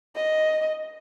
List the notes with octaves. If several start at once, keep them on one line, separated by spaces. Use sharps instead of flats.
D#5